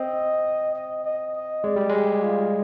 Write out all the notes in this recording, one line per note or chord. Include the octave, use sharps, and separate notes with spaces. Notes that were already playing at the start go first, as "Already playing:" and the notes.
Already playing: C4 D#5
D#5
D#5
D#5
G#3 D5
G3
G#3 G4
F4